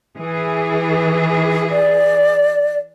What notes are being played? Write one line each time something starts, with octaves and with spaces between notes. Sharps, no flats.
E3 G#4
D5